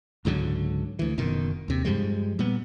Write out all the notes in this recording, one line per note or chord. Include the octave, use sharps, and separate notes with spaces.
C#2 G#2 D3 F#3
D2 E3
F#1 B2 D#3
D#2 C3
G2 F3 G3 G#3
A#2 G3 B3